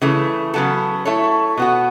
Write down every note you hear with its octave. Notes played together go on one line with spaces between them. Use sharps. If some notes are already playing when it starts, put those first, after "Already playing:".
C#3 E3 A3
C#3 F#3 B3 A4
A3 E4 A4 C#5
B2 B3 F#4